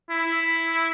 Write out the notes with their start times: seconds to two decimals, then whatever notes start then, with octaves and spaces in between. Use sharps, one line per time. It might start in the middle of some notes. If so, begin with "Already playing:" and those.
0.10 E4